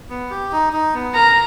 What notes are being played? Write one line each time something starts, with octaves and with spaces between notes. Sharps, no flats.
B3
G4
D#4
D#4
B3
A#4 A#5